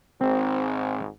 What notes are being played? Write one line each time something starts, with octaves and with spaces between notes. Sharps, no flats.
G#1 G#2 C4